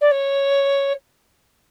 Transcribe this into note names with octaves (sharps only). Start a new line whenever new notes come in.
D5
C#5